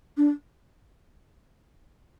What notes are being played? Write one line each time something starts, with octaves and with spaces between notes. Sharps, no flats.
D4